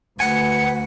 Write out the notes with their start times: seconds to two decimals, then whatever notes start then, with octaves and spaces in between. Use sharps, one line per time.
0.20 D2 B4 F#5 G#5 C#7